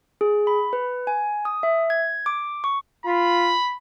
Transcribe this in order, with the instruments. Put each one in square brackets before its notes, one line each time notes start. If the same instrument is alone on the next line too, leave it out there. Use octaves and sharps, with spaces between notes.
[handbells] G#4
B5
B4
G#5
D#6
E5
G#6
D6
C#6
[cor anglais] F4 [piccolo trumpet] B5